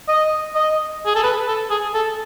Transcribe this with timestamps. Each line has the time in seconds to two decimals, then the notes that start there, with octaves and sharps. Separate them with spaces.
0.08 D#5
0.55 D#5
1.06 G#4
1.16 A4
1.24 B4
1.48 A4
1.70 G#4
1.94 A4